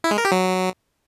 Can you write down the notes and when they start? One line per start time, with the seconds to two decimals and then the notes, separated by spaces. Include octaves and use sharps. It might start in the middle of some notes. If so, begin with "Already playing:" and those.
0.04 E4
0.11 G#3
0.18 A#4
0.25 G4
0.32 F#3